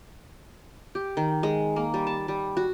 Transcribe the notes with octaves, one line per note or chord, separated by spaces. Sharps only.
G4
D#3
G#3
A#3
G3
A5
G3
F#4